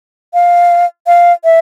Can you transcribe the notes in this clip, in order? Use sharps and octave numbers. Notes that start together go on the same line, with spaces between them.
F5
F5
E5